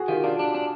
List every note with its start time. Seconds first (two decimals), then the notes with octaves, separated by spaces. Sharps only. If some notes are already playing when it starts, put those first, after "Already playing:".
Already playing: F#4 G#4
0.08 D#3 F4 G4
0.24 D4 F4 G4
0.39 D4
0.55 D4